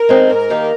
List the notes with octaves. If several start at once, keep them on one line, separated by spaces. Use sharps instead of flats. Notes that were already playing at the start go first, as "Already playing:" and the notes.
Already playing: A#4
G#3 C4 D#4
G#2 A#4
D#3 A#3 D#4 G4